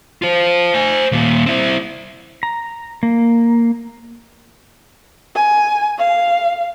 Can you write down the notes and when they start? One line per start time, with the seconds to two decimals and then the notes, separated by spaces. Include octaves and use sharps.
0.22 F4 C5
0.74 C5 G#5
1.12 D#2 A#2
1.46 C4 E4
2.43 A#5
3.03 A#3
5.35 G#5
5.98 F5